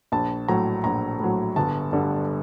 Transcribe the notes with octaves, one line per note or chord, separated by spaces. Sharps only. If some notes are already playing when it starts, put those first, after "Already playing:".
A#1 A5
A2 F#3 A#5
A#1 A#5
A2 F#3
G1 A5
G2 D3 G3